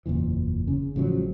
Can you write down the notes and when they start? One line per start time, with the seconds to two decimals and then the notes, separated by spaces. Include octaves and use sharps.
0.06 F#1 E2 A#2 E3
0.67 C#3
0.96 A1 C#3 F3 F#3